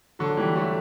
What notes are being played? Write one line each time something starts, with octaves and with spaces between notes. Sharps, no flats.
D3 F#3
E3 G3
F#3 A3